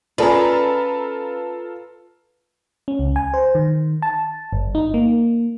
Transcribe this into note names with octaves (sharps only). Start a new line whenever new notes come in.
C#4 F4 G#4 A4 B4 D5 A#5
C#4
C#2
G#5
C5
D#3
A5
G1
D#4
A#3